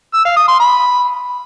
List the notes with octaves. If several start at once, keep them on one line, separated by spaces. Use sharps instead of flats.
E6
F5
D#6
C6
B5